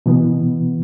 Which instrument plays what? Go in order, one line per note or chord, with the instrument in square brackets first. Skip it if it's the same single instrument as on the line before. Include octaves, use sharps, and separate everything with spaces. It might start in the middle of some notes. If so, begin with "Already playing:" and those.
[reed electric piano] B2 E3 B3